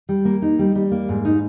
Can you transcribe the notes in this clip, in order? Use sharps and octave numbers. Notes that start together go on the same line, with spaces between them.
G3
A#3
D#4
G3
G3
A#3
G#2
D#4